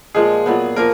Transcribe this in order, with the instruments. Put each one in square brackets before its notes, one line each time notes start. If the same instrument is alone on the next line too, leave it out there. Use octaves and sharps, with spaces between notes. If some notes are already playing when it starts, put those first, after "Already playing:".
[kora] A#2 F3 G#3 [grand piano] G#4
[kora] A#2 F#3 B3
[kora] F3 A#3 [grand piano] A#4